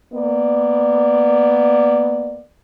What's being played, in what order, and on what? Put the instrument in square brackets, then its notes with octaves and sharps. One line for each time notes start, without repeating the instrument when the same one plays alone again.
[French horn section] A#3 B3 D5